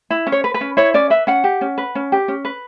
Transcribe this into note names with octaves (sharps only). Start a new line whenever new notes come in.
E4
C#4
C#5
B4
B4
C#4
E4 C#5
C#4 D5
B4 E5
C#4 F#5
G4
C#4
B4
C#4
G4
C#4
B4